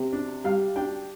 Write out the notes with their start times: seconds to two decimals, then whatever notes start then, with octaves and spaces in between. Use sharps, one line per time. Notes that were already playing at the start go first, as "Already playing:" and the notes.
Already playing: C3
0.13 D4
0.44 G3 F5
0.76 D4 G5